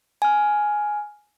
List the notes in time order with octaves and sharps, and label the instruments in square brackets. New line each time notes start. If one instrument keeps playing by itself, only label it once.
[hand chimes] G#5 F6